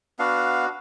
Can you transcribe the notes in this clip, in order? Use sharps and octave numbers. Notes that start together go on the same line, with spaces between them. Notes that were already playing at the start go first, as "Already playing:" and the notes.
B3 D4 F#4 F5